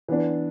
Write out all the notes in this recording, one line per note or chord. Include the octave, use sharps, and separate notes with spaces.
E3 B3 D4